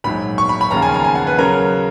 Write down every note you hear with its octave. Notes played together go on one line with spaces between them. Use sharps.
A#1 G#2 F#3 B5
C#6
B5
B5
D#2 C#3 F3 A#5
G#5
A#5
G#5
F#5
B4
C#3 F#3 C#4 A#4